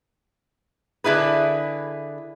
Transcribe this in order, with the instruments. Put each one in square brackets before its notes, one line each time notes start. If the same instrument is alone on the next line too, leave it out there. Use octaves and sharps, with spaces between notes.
[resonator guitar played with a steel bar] D3 E4 G#4 B4